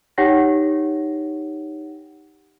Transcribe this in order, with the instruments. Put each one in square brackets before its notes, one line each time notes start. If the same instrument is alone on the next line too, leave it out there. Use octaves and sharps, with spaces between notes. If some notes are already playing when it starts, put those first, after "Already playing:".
[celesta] D#4 G4 C#5 F#5 G5 A#6